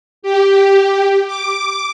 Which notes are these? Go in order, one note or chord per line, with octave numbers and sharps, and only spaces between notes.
G4
D6